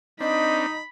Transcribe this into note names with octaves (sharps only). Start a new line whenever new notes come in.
C4 D4 D#4 D#5 B5